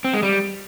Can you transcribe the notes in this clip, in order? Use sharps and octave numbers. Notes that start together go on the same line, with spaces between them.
C4
G#3
G3